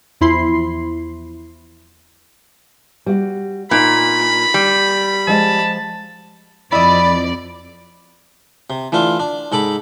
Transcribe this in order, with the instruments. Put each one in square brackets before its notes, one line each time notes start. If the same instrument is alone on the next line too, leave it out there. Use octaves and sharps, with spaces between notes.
[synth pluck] E2 F3 E4 B5 C6 C7
[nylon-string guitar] G3 F#4
[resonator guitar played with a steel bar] A#2 [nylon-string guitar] D4 D#4 [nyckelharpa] B5
[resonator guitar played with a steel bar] G3
[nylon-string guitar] F3 G#3 D#5 [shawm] A5
[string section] F2 D5 [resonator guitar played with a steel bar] E4 D#5 [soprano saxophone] B5
[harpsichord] C3
E3 A3 D4 F4
D4
G#2 A4 B5 D6